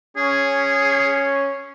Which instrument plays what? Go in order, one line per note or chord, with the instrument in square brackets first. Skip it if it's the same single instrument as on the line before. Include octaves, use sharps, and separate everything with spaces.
[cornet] C#4 [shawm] G#4